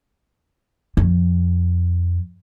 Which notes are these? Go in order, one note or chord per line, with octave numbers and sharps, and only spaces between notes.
F2